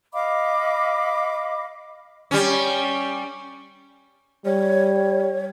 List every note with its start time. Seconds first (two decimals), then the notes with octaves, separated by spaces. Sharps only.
0.13 D#5 F5 B5 D6
2.31 G3 C#4
4.46 G3 C#5